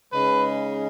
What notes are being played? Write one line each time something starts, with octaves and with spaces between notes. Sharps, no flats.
C#3 G#3 D#4 B4